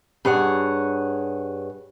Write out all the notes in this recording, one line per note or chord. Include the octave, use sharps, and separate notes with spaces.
G2 G#4 C#5 F#5